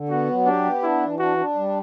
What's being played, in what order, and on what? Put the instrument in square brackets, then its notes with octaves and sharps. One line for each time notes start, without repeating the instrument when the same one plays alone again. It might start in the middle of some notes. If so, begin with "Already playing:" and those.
Already playing: [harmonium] D3
[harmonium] B3 [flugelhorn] F#4
[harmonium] F#3
[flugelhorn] D4 [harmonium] G4
[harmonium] B3
[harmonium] D4 [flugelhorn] E4
[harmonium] E3
[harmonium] D4 [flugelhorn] F#4
[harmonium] D4
G3